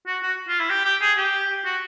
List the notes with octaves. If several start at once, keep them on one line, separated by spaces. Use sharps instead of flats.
F#4
F#4
F4
E4
G4
G4
G#4
G4
F#4